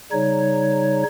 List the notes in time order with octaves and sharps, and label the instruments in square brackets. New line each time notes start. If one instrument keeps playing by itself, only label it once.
[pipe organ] C#3 G3 D#4 C#5